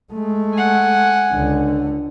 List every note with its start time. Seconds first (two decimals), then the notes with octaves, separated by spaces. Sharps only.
0.13 G#3 A3
0.54 F#5 G#5
1.32 C#2 D3